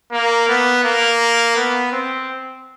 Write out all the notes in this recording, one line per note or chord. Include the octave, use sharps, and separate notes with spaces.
A#3
B3
A#3
B3
C4